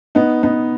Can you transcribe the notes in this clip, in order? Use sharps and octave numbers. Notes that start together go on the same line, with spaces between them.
B3 D#4
B3 D#4